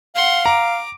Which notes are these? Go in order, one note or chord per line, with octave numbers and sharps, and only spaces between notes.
F5 F#5 C6
A#5 D6